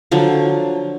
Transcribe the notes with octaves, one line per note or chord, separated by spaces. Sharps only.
D3 F3 F#3